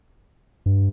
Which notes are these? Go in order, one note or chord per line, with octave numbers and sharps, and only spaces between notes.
G2